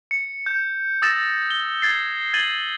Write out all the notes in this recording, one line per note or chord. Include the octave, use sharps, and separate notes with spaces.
C#7
G6
D#6 E6 A6 A#6 E7
G7
G#6 A6 C7
G#6 A6 D#7 F#7 G7